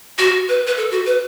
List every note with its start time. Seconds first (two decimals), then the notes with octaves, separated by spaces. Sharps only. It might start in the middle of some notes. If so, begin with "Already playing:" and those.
0.18 F#4
0.49 B4
0.67 B4
0.77 A4
0.91 F#4
1.06 B4